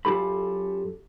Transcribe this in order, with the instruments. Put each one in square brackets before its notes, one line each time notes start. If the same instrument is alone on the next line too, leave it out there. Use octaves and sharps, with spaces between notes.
[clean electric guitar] F#2 F4 G4 A4 B5